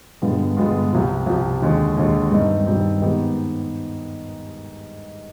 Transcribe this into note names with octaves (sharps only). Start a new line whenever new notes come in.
G2 D3 G#3 B3 F4
G2 D3 G#3 B3 F4
C2 C3 F3
C2 C3 F3
D#2 D3 G#3
D#2 D3 G#3
G2 D#3 G3 C4 D#4
G2 D#3 G3 C4 D#4
G#2 D#3 B3 D#4 G4